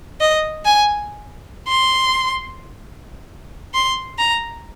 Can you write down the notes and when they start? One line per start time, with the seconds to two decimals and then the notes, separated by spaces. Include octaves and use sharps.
0.21 D#5
0.65 G#5
1.68 C6
3.74 C6
4.19 A#5